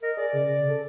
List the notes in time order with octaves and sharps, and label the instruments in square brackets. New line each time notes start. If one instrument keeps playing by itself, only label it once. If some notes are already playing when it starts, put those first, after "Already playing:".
[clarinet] A#4 [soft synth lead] D#5
[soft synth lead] G#4 [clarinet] D5
[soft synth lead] C#3
A4